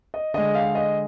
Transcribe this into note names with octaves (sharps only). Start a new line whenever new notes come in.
D#5
D3 G#3 D#5
F5
D#5